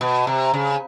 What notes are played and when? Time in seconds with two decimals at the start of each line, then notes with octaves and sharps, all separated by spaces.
0.01 B2
0.27 C3
0.53 C#3